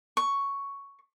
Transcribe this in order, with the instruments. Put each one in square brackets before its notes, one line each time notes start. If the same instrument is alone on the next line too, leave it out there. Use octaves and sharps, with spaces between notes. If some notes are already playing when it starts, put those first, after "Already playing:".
[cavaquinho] C#6